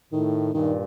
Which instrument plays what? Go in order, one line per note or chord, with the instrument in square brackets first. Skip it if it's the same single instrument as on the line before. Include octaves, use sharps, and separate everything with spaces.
[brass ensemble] A2 [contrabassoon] D#3
[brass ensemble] G2 A#2 [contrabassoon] D#3